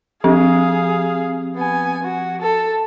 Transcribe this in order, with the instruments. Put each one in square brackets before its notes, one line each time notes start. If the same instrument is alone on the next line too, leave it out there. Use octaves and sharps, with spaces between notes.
[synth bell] F3 C4 G4 [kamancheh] G#4 F5
[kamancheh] B3 G#5
F#4
A4